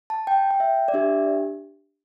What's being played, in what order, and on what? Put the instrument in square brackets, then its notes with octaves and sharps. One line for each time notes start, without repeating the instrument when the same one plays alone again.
[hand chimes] A5
G5
G5
E5
D5
D4 G4 E5